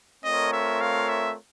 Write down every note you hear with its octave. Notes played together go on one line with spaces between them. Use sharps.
A3 C4 F4 A#4 C#5 D#5
E5
F5
E5